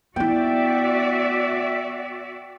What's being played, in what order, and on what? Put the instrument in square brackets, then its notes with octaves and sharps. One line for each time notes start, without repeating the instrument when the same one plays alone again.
[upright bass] B3 E4 [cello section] F#4 D5 E5 [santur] G5